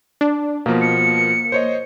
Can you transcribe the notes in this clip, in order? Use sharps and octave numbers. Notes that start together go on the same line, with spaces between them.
D4
B2 F3 A#3
C#7
C5 C#5 D#5